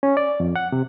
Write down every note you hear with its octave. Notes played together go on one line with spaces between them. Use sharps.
C#4
D5
F2
F#5
C3